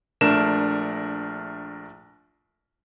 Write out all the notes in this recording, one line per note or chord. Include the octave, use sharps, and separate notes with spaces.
A#1 A3 D4 A#4 F6 E7